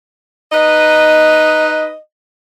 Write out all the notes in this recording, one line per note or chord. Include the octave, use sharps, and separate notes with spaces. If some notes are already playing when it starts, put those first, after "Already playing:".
D#4 B4 D#5